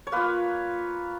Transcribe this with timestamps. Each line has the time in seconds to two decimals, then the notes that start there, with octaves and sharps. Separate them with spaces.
0.07 C#5
0.12 A#3 F4 B4